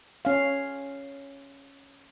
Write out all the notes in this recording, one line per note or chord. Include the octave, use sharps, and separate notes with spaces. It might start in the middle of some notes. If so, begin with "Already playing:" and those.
C#4 F5